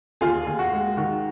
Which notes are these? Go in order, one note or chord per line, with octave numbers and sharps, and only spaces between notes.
D#2 F4 G#4
D#2
F#4
G#3
D#3 F#4